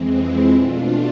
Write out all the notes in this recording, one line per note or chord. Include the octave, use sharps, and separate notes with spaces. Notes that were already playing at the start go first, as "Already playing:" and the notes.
Already playing: F2 E3 G#3 C4
C4 E4
B2 A3 D4 F4